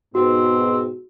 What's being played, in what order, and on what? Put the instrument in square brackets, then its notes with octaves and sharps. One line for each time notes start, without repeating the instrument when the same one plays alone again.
[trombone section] G#2 B2 [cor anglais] C4 [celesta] F#4